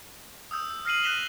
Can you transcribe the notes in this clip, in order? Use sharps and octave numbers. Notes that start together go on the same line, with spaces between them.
D#6 E6 G6
F6 A#6 C7 D#7 F#7
F#6 A#6 B6 E7 F7 G7